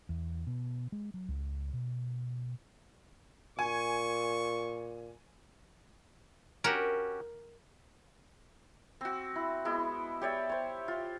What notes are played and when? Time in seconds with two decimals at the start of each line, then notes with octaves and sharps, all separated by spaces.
0.09 E2
0.47 B2
0.92 G#3
1.14 F#3
1.28 C#2
1.73 B2
3.59 A#2 G#5 C#6
6.64 C#4 F#4 G4 A#4
9.01 C4 F#4
9.36 E4
9.65 G#3 B3 E4
10.21 G4 C#5 D5 E5
10.50 C5 C#5
10.88 F4